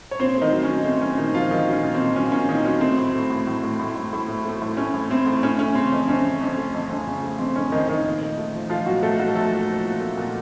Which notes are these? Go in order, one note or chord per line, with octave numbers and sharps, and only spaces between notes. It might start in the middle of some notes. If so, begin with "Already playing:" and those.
C#5
A#2 C4 C5
A3
D#3 D#4
F#3
C#4
F#3
A3 C4
F#3 C#4
A#2 D#3 D#4
F3 F#3 F4
D#3 F#3 D#4
F#3 C#4
A#2
C4
A#2
F#3 C#4
A#2 C#4
A#2 D#3 D#4
F#3 C#4
A3 C4
A2
A3
A2
A2
A2
A2
A2
A2
A3
A3
A2
A3 C#4
A2
A3 C4
A2
A3 C#4
A3 C#4
C#3 C4
F2 C#4
F2 C#4
F2
F2
A3
F2
F2
C#3
A3
F2 C4
F2 C#4
F2 D#3 D#4
F2 D#3 D#4
A#2
A3
A3
F3
F3 A3 F4
A#2 F#3 F#4
A3 A4
F#3 A3 F#4
F3 A3 A4
A#2
F3
A#2
A3
A#2